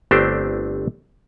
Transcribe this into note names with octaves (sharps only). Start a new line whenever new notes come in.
G1 A3 C4 D4 G4 C5